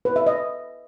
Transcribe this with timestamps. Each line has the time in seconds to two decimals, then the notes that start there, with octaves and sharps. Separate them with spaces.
0.05 B4
0.16 E5
0.27 D#5